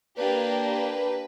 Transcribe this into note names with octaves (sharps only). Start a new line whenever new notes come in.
A#3 D4 G4 B4
B4